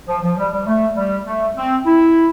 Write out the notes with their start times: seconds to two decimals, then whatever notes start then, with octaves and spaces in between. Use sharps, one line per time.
0.08 F3
0.23 F3
0.37 G3
0.52 G3
0.67 A3
0.97 G3
1.26 A3
1.56 C4
1.86 E4